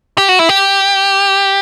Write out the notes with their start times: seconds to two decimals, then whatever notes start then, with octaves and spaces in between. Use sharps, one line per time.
0.18 G4
0.29 F#4
0.39 E4
0.49 G4